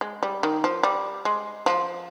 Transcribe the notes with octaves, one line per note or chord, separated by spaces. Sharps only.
G#3
G3
D#3
F3
G3
G#3
F3